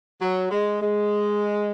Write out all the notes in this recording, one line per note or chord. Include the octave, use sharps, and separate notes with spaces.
F#3
G#3
G#3